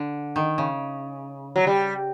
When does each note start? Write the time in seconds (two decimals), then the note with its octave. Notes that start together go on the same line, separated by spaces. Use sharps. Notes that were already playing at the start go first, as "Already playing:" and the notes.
Already playing: D3
0.36 D#3
0.58 C#3
1.56 F#3
1.67 G3